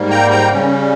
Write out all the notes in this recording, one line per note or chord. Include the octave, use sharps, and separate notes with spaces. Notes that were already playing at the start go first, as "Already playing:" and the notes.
Already playing: G#2 G3 A#3
G5 A#5
G5 A#5
C#3 G3 C#4